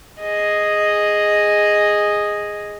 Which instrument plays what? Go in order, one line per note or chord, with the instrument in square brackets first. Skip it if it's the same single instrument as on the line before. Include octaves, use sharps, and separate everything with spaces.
[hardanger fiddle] G#4 D#5